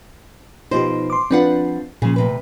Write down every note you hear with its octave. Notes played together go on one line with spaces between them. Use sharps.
B2 F3 D#4 F4 G4 C5
C6 D6
F3 C4 D4 F4 B4 F#5
A#2 C#3 F3 G#4
D2 C3 B4